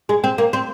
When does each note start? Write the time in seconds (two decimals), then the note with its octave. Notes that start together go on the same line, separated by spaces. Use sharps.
0.09 G#3
0.24 C4
0.38 A#3
0.53 C4